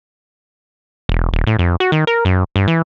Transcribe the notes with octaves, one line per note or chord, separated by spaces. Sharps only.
E1
D#1
A2
F2
F#4
D#3
A#4
F#2
G2
E3